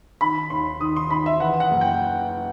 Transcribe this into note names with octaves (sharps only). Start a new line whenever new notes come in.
D#3 B5
D#2 C6
D#3 D#6
C6
D#3 B5
E5
E3 F#5
F#5
F#1
G5